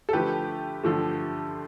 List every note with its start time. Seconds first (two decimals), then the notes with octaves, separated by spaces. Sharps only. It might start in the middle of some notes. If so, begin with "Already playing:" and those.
0.09 A4
0.13 D3 F3 A3 G4 B4
0.83 D3 F3 A3